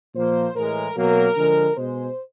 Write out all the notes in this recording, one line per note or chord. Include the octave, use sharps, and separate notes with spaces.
A#2 F3 A#3 C5
A2 E3 G#3 A#4
B2 F#3 A#3 A#4
D3 F3 G#3
B2 G#3 C5